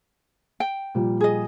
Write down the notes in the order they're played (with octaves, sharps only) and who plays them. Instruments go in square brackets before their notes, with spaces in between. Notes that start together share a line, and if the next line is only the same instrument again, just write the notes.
[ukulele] G5
[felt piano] A#2 F3 G3
[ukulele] G#4 D#5